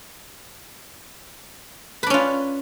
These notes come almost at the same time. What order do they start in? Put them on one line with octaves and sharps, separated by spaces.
B4 D4 C#4 F4